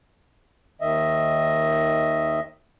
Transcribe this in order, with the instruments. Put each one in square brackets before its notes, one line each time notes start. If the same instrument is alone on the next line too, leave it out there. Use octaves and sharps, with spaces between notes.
[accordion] D#2 D#3 D#5 E5